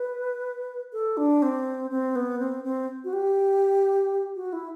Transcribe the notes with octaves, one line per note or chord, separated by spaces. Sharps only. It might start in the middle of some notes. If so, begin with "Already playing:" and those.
Already playing: B4
A4
D4
C4
C4
B3
C4
C4
F#4
G4
F#4
E4